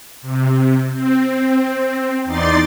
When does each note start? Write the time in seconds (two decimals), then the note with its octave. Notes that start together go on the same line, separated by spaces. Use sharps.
0.22 C3
0.92 C4
2.24 E2 D#4 D5 C6 A6